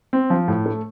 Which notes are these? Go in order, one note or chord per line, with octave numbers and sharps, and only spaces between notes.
C4
F3
A2
A3